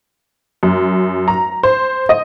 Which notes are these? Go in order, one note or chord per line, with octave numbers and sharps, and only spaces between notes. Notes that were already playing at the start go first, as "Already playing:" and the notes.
F#2
A#5
C5
D#5